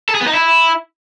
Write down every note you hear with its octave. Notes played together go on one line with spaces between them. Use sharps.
A4
G#4
B3
D#4
E4